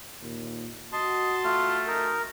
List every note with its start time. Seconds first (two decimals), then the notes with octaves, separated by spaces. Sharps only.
0.22 D#2 A#2
0.93 F#4 D#5 A5 C6
1.44 A3 F4
1.88 D#4 A#4